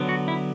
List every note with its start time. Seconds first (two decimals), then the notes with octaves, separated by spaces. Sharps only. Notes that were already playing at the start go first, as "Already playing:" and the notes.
Already playing: D3 F#3 B3
0.09 F#4
0.28 E4